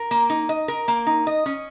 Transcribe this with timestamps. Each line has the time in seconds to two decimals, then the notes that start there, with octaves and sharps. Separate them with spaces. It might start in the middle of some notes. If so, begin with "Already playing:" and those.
Already playing: A#4
0.11 A#3
0.30 D#4
0.49 D#5
0.68 A#4
0.88 A#3
1.07 D#4
1.27 D#5
1.46 C#4